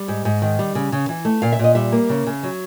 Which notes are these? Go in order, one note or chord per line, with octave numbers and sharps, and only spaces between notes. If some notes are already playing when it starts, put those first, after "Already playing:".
Already playing: G3
G#2
G#2
D#3
G3
C#3
C#3
E3
A3
A#2 F5
E5
A#2 D#5
G3 E5
A#3
C#3
C#3
F#3